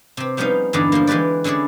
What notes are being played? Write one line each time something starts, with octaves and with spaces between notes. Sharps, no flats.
C3 C4
F3 G3 B3 C#4 D#4 F5
E2 G2 D3 D#4 E4 D5
F3 G3 A#3
E3 G#3 G4 B4 D5
D3 C#4 E4 G#4 D5